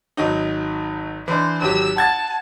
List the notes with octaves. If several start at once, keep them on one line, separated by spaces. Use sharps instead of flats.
G#1 F#3 D#4
E3 D4 C5
G#1 F#3 G4 E6
F#5 A5 G#6 A6